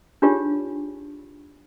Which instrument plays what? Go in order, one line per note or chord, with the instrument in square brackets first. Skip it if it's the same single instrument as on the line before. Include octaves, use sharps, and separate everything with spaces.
[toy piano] D4 D#4 F4 G4 G#4 C#5